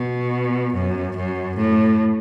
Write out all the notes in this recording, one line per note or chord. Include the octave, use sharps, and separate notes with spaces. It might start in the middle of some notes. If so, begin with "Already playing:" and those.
Already playing: B2
F#2
F#2
A2